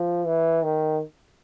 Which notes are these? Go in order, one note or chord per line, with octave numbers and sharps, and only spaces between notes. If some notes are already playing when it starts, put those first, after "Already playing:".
Already playing: F3
E3
D#3